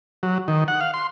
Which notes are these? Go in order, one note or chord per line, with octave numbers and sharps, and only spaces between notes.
F#3
D#3
F#5
F5
C6